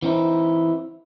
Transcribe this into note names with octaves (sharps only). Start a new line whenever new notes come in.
E3 C4 D#4 E4